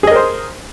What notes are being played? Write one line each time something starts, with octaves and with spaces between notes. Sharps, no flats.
G#4 A#4 C5 D#5